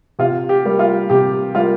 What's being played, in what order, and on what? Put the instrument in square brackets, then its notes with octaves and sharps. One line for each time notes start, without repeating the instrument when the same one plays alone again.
[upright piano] C3 F4
G4
G3 A#3
F4
C3 G4
G3 A#3 F4